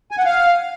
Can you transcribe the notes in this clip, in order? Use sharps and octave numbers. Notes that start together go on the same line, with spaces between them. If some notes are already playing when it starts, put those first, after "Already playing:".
G#5
F#5
F5